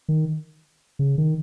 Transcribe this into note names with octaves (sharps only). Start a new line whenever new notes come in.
D#3
C#3
D#3